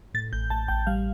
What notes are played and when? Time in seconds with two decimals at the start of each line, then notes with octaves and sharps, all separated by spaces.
0.14 A2 A6
0.33 A1 G6
0.50 A1 A5
0.68 A1 G5
0.87 G3 F5